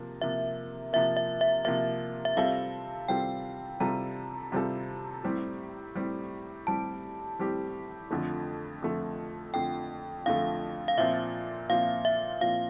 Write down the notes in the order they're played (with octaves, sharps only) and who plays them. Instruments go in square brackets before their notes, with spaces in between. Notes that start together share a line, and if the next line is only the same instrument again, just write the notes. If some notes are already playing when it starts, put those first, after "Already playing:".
Already playing: [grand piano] C3 F3 A#3
[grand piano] C3 F3 A#3 [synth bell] E5
[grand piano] C3 F3 A#3 [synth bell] E5
[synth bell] E5
E5
[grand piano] C3 F3 A#3 [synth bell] E5
[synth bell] E5
[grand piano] C3 G3 C4 F4 A4 [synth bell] F5
[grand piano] C3 G3 C4 F4 A4 [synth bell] G5
[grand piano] C3 G3 C4 F4 A4 [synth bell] A#5
[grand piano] C3 G3 C4 F4 A4
A2 G3 C4 G4
A2 G3 C4 G4
[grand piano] A2 G3 C4 G4 [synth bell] A5
[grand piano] A2 G3 C4 G4
F2 D3 F3 A3
F2 D3 F3 A3
[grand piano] F2 D3 F3 A3 [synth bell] G5
[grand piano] F2 D3 F3 A3 [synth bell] F5
[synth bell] F5
[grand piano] A#2 F3 C4 F4 [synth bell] E5
[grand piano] A#2 F3 C4 F4 [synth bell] F5
[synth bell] E5
[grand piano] A#2 F3 C4 F4 [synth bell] F5